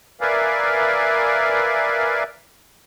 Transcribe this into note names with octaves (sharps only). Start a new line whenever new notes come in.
A#4 B4 D5 E5 F5 G#5